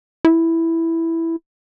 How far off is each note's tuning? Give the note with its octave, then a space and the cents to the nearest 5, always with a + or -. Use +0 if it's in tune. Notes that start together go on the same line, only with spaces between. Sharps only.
E4 +0